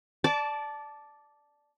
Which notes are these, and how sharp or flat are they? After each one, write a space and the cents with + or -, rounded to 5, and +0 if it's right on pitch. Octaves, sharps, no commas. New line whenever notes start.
D5 +0 A5 -10 D6 -25